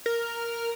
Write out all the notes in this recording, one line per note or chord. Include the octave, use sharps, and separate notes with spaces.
A#4